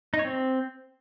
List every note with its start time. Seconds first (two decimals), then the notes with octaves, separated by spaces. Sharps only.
0.14 D#4
0.19 C#5
0.25 C4